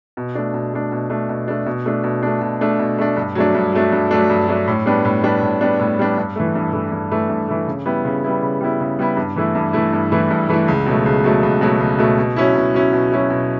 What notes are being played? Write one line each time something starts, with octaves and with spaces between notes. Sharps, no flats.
B2
A3 D4
B2
A3 D4
B2
A3 D4
B2
A3 D4
B2
A3 D4
B2
A3 D4
B2
A3 D4
B2
A3 D4
G2
F#3 A3 D4
G2
F#3 A3 D4
G2
F#3 A3 D4
G2
F#3 A3 D4
A2
G3 B3 D4
A2
G3 B3 D4
A2
G3 B3 D4
A2
G3 B3 D4
G2
E3 A3
G2
E3 A3
G2
E3 A3
G2
E3 A3
C#3
G3 B3 E4
C#3
G3 B3 E4
C#3
G3 B3 E4
C#3
G3 B3 E4
G2
E3 A3 E4
G2
E3 A3 E4
G2
E3 A3 E4
G2
E3 A3 E4
C#2
B2 F#3 A3
C#2
B2 F#3 A3
C#2
B2 F#3 A3
C#2
B2 F#3 A3
B2
F#3 C#4 E4
B2
F#3 C#4 E4
B2
F#3 C#4 E4
B2